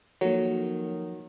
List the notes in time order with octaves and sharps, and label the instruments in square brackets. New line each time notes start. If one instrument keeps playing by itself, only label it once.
[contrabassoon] D#3 [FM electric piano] F3 A#3 [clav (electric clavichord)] F#3 [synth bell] F#4 A4 C#5